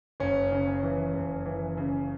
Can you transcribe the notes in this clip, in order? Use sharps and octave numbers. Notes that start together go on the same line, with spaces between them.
F#1 C#4
C#3
C#4
E3
F#1
E3
C#3